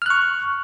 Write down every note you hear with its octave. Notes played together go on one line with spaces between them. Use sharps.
C#6 F6 F#6